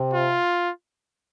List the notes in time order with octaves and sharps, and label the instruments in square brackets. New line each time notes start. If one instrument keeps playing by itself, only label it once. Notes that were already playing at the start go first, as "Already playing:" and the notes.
Already playing: [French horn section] C3
[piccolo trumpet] F4